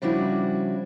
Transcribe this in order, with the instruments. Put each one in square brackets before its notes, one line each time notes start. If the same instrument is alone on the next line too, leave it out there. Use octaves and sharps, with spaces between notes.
[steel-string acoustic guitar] C#3 F3 G3 D4 E4 F#4